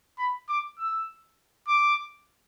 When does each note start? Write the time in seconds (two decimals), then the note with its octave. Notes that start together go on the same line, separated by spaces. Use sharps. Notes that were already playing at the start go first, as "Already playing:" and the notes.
0.18 B5
0.49 D6
0.78 E6
1.67 D6